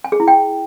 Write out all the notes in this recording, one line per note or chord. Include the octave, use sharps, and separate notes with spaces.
G#5
G#4
E4
G5